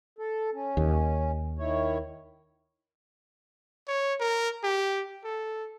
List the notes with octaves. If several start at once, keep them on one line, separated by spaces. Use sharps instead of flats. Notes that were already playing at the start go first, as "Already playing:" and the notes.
A4
C#4
D#2
D#3 E4 C#5
C#5
A#4
G4
A4